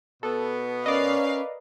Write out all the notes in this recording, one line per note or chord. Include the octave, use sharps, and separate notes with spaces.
B2 B3 A4
C#4 A#4 B4 D5 D#5 F5